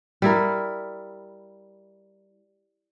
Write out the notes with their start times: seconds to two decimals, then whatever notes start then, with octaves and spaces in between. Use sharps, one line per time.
0.22 G3 E4 A#4